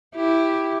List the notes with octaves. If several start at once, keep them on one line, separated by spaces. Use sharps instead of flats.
E4 G4